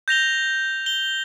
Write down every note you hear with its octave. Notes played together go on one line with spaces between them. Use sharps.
G6 A#6 F7 G7
G7